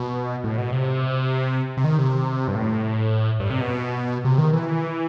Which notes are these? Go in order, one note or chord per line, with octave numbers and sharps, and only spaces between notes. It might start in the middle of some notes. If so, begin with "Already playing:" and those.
Already playing: B2
A2
B2
C3
C3
D#3
C3
G2
A2
G2
C3
B2
C3
D#3
E3